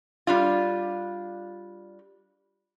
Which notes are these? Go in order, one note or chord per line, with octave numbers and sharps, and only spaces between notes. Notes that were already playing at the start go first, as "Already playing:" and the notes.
G3 D4 F4